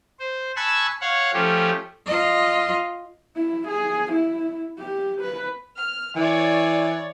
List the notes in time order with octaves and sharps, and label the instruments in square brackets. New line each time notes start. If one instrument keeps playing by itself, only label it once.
[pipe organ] C5
G#5 A5 B5 C#6 E6 F#6
C#5 F5 F#5
F3 A3 C#4 G4
[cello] F4 D#5
[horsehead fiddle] E4
G#4
E4
G4
B4
[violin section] F6
[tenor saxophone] E3 [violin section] C#5 D5